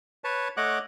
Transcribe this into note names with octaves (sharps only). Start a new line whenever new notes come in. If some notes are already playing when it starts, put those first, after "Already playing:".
B4 C#5 A5
A3 C#5 D#5 F#5 D6 F#6